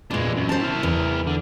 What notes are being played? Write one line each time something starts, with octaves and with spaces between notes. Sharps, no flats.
E2 A#2 G#3 D4
F#2
C5 A5
E4 A#4
E2
D3